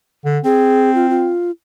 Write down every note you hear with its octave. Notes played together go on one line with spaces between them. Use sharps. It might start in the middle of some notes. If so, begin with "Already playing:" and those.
D3
C4 G#4
F4
F4